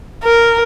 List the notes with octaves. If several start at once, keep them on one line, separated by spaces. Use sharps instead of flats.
A#4